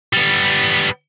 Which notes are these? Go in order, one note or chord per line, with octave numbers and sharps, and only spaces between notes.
G3 B3